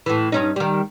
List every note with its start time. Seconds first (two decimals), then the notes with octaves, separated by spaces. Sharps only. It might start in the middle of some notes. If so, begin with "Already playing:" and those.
0.06 A2 E3
0.32 G2 C#4 D#4
0.56 D#3 G3